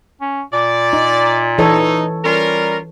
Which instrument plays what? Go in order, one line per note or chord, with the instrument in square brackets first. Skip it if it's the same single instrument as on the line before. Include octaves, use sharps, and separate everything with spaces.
[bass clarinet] C#4
[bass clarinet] A#2 [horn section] D5
[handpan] D#4
[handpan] E3 A4 C#5 [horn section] D#4
[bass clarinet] G3 [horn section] C#4 F4 A#4